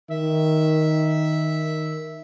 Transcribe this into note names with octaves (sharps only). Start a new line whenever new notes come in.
D#3 E5